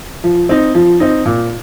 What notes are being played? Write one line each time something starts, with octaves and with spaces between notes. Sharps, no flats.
F3
C4 D#4
F3
C4 D#4
A#2